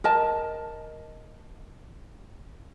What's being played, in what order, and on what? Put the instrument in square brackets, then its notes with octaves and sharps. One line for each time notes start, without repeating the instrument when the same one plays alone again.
[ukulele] A#4 D#5 A5